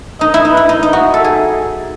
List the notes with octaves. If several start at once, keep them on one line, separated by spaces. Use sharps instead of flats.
D#4 D#5
E4
D#4
B4
E4
D#4
D#4 D#5
F#4
A4 E5
G#4